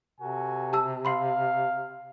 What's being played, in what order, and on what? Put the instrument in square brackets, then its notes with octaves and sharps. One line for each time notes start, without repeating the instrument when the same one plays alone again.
[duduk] C3 [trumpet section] F#4 A4 G#5
[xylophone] G4 A5 E6
[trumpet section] F5 [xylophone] B5 C6 C7